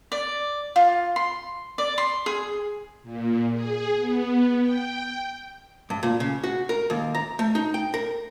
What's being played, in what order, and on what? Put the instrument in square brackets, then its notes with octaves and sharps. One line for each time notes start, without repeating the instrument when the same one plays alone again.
[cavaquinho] D5
F4
C6
D5
C6
G#4
[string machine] A#2
G#4
B3
G5
[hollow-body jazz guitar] G2
A#2
C#3
F#4
A#4
D#2
A#5
A3
D#4
G5
A#4